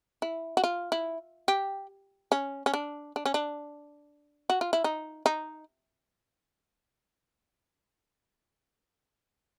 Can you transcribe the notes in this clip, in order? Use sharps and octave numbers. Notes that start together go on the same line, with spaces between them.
E4
F#4
F4
E4
G4
C#4
C#4
D4
D4
C#4
D4
F#4
F4
E4
D#4
D#4